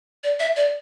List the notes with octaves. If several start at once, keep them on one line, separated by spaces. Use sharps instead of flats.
D5
E5
D5